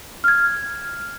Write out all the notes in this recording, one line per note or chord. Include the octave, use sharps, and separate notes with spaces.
F6 G#6